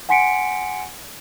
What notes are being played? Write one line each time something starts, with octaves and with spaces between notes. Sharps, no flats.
F#5 G#5 C6 B6 C#7 D7